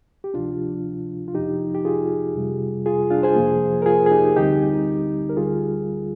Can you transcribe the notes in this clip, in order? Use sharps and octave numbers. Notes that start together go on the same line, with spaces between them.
G4
D2 C3 F3 D4 F4
F4
F2 C3 F3 D#4 G4
G4
F4 G#4
F2 C3 G3
F4 G#4
D4 F4
G#4 C5
F2 C3 F3 A#3
A#4
F4 G#4
G#4
D#4 G4
D2 D3 G3 C4 D#4 G4
A#4
D2 D3 G3 F4 G#4